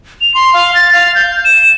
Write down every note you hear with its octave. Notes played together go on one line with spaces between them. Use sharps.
F7
C6
F5
A6
F5
G6
E7